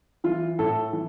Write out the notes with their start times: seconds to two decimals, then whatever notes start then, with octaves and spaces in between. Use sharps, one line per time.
0.24 E3 F4
0.59 A2 A4
0.93 E3